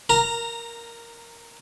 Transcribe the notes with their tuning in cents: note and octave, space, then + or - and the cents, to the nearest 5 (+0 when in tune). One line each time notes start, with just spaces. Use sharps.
A#4 +0 A#5 -15